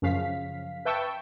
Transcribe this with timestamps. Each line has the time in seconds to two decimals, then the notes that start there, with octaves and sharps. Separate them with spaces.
0.02 F#2 C#3 F3 F5 B6
0.85 B4 E5 G5 A5 C#6 E6